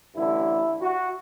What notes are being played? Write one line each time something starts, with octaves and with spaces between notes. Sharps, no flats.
A1 G2 D3 E4
F#4